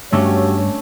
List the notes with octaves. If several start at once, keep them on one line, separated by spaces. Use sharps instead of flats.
G2 A3 C#4 D4 F#4 G4 C#5